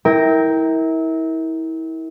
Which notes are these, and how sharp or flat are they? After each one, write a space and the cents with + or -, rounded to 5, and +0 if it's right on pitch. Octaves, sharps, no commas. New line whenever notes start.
E4 -30 A#4 +0 G5 +0